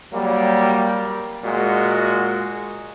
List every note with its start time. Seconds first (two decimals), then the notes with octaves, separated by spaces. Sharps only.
0.13 F#3 G3 A#3
1.44 A#2 G#3 F#4